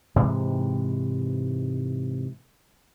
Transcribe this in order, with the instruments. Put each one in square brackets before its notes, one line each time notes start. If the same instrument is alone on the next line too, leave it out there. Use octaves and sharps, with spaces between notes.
[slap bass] G#2 C3 E3 G#3